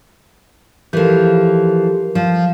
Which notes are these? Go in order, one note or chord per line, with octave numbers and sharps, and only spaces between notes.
E3 F3 G4 A4 A#4
F3